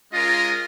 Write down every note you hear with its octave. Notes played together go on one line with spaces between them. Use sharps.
G#3 C#4 F4 A#4 D#5